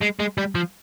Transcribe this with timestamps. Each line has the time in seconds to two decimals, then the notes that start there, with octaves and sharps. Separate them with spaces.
0.02 G#3
0.20 G#3
0.38 G3
0.55 F3